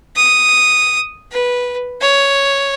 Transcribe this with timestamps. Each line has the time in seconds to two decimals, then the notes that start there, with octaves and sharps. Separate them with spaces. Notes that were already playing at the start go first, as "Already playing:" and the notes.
0.16 D#6
1.32 B4
2.01 C#5